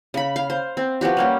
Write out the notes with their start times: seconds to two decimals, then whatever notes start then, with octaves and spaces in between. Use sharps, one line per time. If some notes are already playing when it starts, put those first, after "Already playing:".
0.14 C#3 B5
0.36 F5
0.50 C5
0.77 C4
1.01 F3 B3 F#4 G4
1.17 G3 A#3 C#4